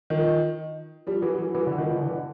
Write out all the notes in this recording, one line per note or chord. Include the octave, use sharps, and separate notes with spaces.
D#3 F3
F3 G3
E3 F#3
E3 F#3
E3 F#3
D3 E3
D#3 F3
D3 E3
D3 E3